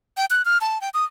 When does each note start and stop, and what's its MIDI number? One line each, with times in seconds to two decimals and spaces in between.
0.17 0.25 79
0.30 0.45 90
0.45 0.58 89
0.61 0.81 81
0.81 0.89 79
0.94 1.05 87